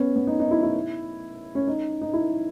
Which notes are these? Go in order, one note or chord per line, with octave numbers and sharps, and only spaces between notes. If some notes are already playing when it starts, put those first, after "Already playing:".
Already playing: B3 C#4
B3
D#4
D#4
E4
E4
C#4
D#4
D#4
E4